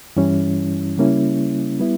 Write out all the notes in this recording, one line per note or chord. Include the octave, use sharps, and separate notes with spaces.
G2 E3 G3 C#4 E4
C#3 G3 A#3 C#4 E4
G3 B3 E4